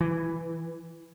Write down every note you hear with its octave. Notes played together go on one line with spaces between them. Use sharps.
E3